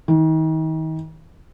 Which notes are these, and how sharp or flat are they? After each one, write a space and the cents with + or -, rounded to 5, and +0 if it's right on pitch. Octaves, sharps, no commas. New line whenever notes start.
D#3 +35